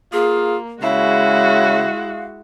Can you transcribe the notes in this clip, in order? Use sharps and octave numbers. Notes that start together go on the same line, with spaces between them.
A#3 F4 G#4
C#3 G#3 E4 F#4 F5